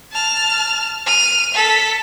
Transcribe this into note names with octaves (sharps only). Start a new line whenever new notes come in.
A5 F6
F6 D#7
A4 B6